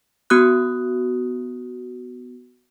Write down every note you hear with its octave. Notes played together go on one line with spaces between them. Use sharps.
B3 F#4 D#6 F#6